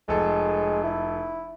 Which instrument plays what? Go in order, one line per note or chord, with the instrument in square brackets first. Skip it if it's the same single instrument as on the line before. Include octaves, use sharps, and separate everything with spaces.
[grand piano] F1 A4 [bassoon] G#3
[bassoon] E4